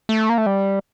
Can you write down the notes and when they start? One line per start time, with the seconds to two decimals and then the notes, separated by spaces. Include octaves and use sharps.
0.09 A3
0.29 A#3
0.38 A3
0.46 G3